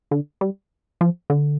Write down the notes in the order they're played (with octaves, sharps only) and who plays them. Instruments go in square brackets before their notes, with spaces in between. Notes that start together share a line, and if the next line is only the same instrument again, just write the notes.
[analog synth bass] D3
G3
F3
D3